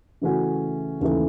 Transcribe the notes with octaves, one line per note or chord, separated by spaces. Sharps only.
C#3 E3 A3 C#4 F#4
D#2 C#3 E3 A3